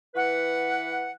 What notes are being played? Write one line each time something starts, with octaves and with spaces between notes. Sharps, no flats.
E3 B4 F#5